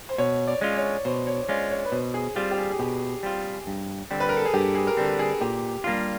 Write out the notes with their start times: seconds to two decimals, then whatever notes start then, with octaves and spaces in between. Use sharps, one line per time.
0.09 C5
0.18 B2 C#5
0.47 D5
0.61 G#3 C#4 F4
0.76 C#5
1.05 B2 C5
1.27 C#5
1.49 G#3 C#4 F4 D5
1.71 C#5
1.85 B4
1.92 B2 C5
2.14 G#4
2.36 G3 C4 F4 G4
2.51 G4
2.58 G#4
2.71 G#4
2.79 B2 G4
3.23 G3 C4 F4
3.67 G2
4.11 D3 G3 C4
4.20 B4
4.29 A#4
4.37 A4
4.45 G#4
4.54 G2 G4
4.75 G#4
4.87 A#4
4.97 D3 G3 C4 A4
5.19 G#4
5.41 A#2 G4
5.84 G3 A#3 D4 F4